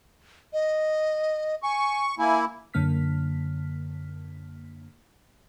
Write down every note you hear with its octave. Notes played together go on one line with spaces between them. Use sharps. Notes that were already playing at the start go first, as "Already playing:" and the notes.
D#5
G#5 C#6
A#3 E4 G#5
F#2 D3 A#3 F6 B6